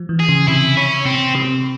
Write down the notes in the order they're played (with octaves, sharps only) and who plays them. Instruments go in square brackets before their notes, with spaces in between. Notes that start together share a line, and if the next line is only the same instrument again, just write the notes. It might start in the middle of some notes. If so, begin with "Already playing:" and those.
Already playing: [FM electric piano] F3
E3
[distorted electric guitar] G#4
[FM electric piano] C#3
[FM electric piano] C3 [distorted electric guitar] E4
[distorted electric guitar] C#4
[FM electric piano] C3 [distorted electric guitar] C4
[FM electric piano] C3